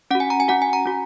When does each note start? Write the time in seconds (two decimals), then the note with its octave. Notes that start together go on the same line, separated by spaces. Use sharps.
0.11 C#4 F#5
0.15 F#4
0.20 G#5
0.30 A#5
0.40 G#5
0.48 C#4 F#4 F#5
0.62 G#5
0.73 A#5
0.86 C#4 F#4